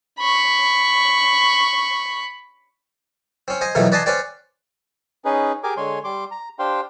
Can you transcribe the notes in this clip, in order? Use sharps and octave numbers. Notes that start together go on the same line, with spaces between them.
B5 C#6
C4 C#4
C5 D#5 G#5
F2 B2 D#3 E3 F#3 A3
B4 D5 D#5 G#5 A5 C6
C#4 B4 C5 D5 G5
C#4 D#4 G#4 B4
G4 G#4 A#4 G#5 D6
D3 G#3 C#5 G#5 C6
G3 C6 D6
A#5
D4 G4 C5 F5 G5 C6